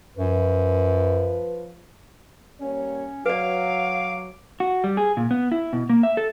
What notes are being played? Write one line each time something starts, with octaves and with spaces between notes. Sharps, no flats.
F#2 F3 B4
G3 A#3 C#4 C#5
F#3 B4 D5 F5 D6
F#4
G3
G#4
A#2
B3
E4
B2
A#3
E5
A4